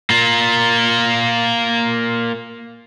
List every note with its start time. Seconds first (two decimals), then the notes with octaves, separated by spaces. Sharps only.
0.10 A#3 F4